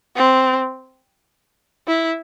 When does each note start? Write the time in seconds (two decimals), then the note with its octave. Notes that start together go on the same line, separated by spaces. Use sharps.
0.16 C4
1.87 E4